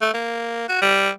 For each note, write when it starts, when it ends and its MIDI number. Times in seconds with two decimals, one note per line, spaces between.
0.02 0.10 57
0.14 0.65 58
0.68 0.78 66
0.82 1.10 55